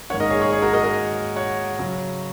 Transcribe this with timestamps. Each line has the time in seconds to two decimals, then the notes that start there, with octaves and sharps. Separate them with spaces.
0.10 G#2 D#3 A#3 C#4 C#5 F#5
0.20 A#4 D#5
0.31 G#4 C#5
0.42 G#4 C#5
0.52 G#4 C#5
0.62 F#4 A#4
0.73 A#4 D#5
0.83 A#4 D#5
1.36 C#5 F#5
1.79 C#3 F#3 C#4